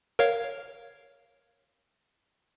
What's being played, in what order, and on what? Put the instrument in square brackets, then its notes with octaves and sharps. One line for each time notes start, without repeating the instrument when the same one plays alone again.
[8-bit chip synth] A#4 C#5 F5